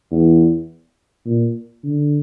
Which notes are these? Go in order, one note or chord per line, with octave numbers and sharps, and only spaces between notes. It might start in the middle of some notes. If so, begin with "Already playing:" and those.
E2
A#2
D3